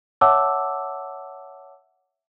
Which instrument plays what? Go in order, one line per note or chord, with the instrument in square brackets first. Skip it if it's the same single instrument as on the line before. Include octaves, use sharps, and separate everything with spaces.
[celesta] C#5 E5 F#5 A5 D6 E6